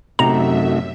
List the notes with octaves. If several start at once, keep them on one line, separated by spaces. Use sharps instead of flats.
F#2 C3 A3 D#4 F#4 E5 A#5